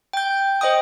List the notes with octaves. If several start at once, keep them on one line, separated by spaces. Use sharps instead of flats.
G5 G6
C5 D#5 G5 D#6